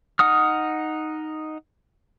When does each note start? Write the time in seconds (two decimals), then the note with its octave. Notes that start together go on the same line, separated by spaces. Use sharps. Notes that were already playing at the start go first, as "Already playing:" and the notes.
0.19 D#4 F#5 D#6 F6